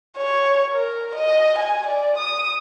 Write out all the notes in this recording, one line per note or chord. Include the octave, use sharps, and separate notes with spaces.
C#5
A#4
D#5
G#5
D5
D#6